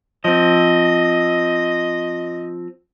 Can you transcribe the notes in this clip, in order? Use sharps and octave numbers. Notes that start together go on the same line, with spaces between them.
F3 C4 D#5